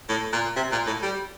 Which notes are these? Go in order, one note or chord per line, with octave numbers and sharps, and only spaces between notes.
A2
A#2
C3
A#2
A2
G3